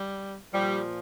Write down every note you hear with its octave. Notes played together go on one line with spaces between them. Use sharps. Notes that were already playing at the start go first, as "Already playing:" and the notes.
Already playing: G3
A#2 F3 G3